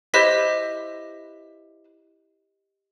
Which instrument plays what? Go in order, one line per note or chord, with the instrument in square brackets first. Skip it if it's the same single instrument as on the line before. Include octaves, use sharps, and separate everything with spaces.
[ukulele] E4 B4 C5 [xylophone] G4 D#5 B6